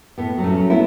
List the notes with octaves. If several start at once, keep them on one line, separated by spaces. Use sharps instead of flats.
A2 B3
F#3
A3 C#4
F#3
B3 E4